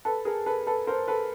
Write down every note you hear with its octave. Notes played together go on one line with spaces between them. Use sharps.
A4 B4
G#4 A#4
A4 B4
A4 B4
A#4 C5
A4 B4